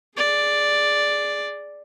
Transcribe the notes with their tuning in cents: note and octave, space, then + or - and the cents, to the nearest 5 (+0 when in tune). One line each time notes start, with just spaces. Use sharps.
G#4 +0 D5 +0